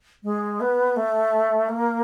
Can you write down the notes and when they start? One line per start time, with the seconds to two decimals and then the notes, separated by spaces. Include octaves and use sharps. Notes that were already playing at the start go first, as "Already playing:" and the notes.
0.23 G#3
0.60 B3
0.96 A3
1.69 A#3